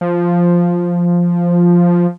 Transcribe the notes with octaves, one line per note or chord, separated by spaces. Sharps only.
F3